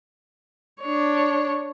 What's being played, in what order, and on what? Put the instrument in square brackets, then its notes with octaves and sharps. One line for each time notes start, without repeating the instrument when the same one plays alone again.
[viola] D4 C#5